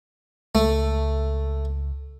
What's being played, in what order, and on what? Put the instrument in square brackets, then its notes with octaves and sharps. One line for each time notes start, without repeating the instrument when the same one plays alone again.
[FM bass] C#2 [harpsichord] A3